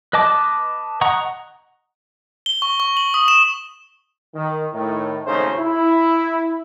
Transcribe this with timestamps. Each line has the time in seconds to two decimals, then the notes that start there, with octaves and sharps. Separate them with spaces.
0.13 B4 D#5 A5 D6
1.01 D#5 F#5 A#5 C#6
2.46 G7
2.62 C#6
2.80 C#6
2.97 F#7
3.14 D#6
3.28 E7
4.35 D#3
4.73 A2 D#3
5.26 G#1 C#3 A3 C#4 D#4 C5
5.58 E4